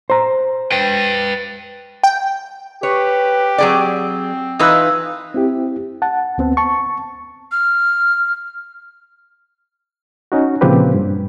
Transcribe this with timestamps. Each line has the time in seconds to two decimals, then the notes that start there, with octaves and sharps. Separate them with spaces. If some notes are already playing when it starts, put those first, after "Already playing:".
0.10 C5 A#5
0.72 B4 G5
2.04 G5
2.83 G4 B4 C#5
3.58 F#3 C4 G#4 D5
4.59 E3 D#4 F4 B4 D#6 E6 F#6
5.34 C4 E4 G4
6.02 F#5 A5
6.38 D2 B3 C4
6.57 A5 C#6
7.52 F6
10.32 C#4 D#4 F#4
10.61 A#2 C#3 F3 C4 G4 B4
10.94 G2